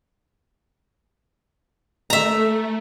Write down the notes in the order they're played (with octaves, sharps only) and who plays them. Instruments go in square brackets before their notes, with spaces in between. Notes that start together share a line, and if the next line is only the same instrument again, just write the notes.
[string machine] A3 [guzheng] E5 A#5